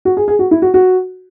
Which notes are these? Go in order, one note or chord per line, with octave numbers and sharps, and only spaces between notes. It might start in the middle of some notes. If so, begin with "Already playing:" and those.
F#4
G#4
G#4
F#4
E4
F#4
F#4